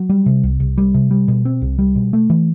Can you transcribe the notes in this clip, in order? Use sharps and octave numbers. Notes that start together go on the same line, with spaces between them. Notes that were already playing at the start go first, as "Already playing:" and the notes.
Already playing: F#3
G3
C3
C2
C2
G3
C3
G3
B2
C4
C2
G3
B2
A3
E3